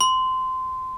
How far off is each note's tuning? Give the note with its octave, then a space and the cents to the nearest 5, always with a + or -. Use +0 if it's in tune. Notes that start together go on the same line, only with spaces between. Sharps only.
C6 -20